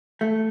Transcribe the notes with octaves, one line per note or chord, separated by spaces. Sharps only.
A3